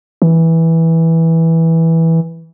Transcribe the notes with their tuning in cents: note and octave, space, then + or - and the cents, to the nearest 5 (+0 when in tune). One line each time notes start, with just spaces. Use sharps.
E3 -10